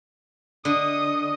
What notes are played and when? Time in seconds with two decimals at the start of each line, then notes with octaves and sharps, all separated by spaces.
0.65 D3 D#5 D#6